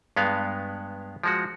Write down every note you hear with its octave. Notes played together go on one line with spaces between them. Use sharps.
G2 G#3 B3 F5
F3 G#3 F#4